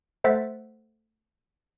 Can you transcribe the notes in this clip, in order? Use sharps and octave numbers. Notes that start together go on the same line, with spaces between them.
A3 C5 E5 F#5 A6 B6